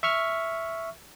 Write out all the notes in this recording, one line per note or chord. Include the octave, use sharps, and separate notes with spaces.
E5 C#6 F6